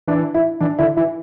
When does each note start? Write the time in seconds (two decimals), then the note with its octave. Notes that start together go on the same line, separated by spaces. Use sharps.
0.07 E3 D4
0.34 E4
0.60 E3 D4
0.79 D3 E4
0.97 E3 E4